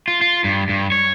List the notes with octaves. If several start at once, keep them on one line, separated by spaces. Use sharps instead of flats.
F4
F4
G2
G2
C#5